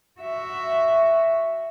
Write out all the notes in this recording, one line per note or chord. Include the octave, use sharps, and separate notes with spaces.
F#4 E5